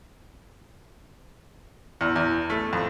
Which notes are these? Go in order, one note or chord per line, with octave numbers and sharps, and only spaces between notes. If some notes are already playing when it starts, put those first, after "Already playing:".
E2
E2
A3
F2